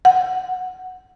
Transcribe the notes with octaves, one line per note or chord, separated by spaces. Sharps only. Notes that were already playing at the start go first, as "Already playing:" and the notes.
F#5